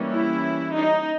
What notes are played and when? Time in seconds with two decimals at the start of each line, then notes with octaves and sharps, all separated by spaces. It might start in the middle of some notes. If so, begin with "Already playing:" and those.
Already playing: E3 G3 A#3 C#4
0.11 E4
0.72 D#4